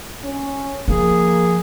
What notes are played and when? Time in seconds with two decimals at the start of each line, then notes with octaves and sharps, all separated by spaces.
0.24 C#4
0.88 F3 A#3 G#4